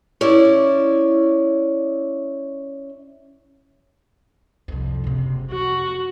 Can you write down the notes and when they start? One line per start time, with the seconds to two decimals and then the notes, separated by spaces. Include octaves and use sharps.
0.21 C#4 E4 D5
4.68 C2 F2
5.04 F#1 C3
5.51 F2 F#4